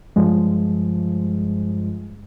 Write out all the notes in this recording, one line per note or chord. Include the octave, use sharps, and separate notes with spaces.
G2 F3 G#3